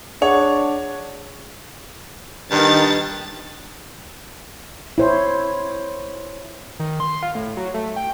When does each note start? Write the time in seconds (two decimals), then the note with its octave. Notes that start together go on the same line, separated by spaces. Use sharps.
0.22 D4 G#4 C#5 F#5
2.51 G2 D#3 A6
4.98 E4 C5 C#5
6.80 D#3
7.00 C6
7.23 F4
7.35 A2
7.57 F#3
7.74 A3
7.96 G5